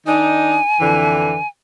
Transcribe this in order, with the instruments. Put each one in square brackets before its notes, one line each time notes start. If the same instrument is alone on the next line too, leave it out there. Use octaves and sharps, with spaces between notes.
[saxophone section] D#3 D4 D#4 [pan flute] G#5
[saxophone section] F2 D3 E3